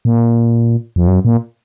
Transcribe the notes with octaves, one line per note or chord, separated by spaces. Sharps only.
A#2
F2
F#2
A#2